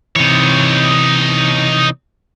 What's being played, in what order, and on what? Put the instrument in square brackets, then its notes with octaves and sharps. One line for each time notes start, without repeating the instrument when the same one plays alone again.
[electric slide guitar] C3 E3 [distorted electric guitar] D#4 C#5